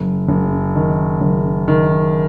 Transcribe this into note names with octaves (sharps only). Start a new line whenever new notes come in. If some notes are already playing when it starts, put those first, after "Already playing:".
Already playing: F#1
F#1
D#3
F#1
D#3